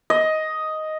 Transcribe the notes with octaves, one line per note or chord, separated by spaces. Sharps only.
D#5